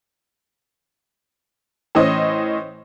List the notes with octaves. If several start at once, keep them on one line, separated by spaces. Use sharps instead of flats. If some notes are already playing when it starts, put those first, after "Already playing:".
A2 E3 C#4 C5 D#5